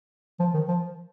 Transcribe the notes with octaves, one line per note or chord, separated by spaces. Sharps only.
F3
D#3
F3